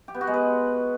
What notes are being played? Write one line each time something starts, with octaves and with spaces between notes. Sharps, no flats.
G4
B3
F#4
G#3
B4